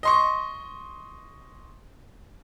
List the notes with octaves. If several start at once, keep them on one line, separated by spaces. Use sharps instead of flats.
D#5 C6 C#6